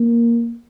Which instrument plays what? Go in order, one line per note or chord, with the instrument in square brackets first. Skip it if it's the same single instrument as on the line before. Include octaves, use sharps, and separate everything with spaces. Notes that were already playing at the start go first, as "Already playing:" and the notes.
Already playing: [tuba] A#3